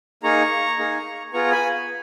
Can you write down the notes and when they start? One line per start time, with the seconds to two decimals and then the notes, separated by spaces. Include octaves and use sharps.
0.23 A#3 D#4 G#4 A#5 C#6
0.79 A#3 D#4 G#4
1.33 B3 F4 G#4 A#5 C#6
1.51 G#5 B5